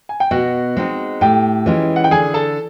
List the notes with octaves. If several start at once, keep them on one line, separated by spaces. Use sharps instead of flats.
G#5
G5
B2 F#4 F#5
G#3 C4 D#4
A2 G4 G5
E3 G#3 C#4 F4
F#5
G5
D3 G#4 G#5
A4 A5